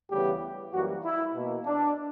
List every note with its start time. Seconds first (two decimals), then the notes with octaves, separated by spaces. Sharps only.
0.11 D2 C#3 E3 G3 B3 G4
0.73 F#2 E3 G3 A#3 F#4
1.04 E4
1.34 B2 A#3
1.65 D4